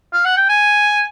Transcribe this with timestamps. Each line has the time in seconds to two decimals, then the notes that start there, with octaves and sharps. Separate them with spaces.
0.13 F5
0.25 F#5
0.36 G5
0.49 G#5